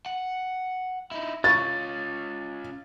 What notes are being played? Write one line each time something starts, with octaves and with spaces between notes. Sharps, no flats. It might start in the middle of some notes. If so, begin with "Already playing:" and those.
F#5
D#4 E4
C#4 F4 C#6 A6